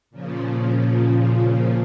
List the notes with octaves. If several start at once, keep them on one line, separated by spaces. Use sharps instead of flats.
A#2 C#3 F3